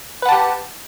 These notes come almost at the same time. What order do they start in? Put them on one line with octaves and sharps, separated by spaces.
B4 F#5 A5 G4